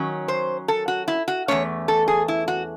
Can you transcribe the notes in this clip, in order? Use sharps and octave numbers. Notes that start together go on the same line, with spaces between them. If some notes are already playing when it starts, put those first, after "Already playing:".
Already playing: D#3 F#3 C#4
C5
A4
F#4
E4
F#4
E2 D#3 A3 C#4 C#5
A4
G#4
E4
F#4